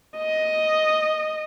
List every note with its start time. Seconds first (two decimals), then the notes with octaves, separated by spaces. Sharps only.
0.17 D#5